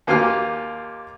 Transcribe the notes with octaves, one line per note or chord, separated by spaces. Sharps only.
D#2 A#3 F4 G4 G#5 F6